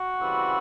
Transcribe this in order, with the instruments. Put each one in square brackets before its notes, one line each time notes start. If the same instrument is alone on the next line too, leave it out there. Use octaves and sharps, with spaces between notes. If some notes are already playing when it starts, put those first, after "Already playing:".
Already playing: [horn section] F#4
C#3 E3 G3 C4